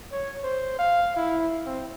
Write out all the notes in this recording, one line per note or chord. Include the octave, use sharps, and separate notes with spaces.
C#5
C5
F5
E4
C4